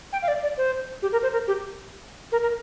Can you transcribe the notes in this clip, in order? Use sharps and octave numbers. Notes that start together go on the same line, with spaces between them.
G5
F5
D5
D5
C5
G4
A#4
C5
A#4
G4
A#4
A#4